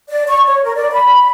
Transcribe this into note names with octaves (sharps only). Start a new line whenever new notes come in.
D5
C#6
C#5
A#4
D5
B5